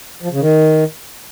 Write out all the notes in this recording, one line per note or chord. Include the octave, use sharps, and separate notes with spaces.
F3
C#3
D#3